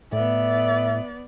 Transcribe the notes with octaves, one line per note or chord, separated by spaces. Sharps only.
A2 B3 D5 E5